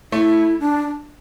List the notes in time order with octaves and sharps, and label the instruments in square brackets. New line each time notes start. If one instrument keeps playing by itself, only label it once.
[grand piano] A3 [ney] E4
[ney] D4